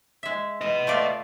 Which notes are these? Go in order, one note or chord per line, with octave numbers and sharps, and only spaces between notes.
G#3 E5
E3 B4 D#5
A3 F4 D5